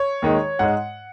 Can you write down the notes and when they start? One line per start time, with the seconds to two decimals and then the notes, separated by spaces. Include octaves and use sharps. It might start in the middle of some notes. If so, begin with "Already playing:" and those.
Already playing: C#5
0.22 D#2 D#3 G#3
0.59 G#2 G#3 F#5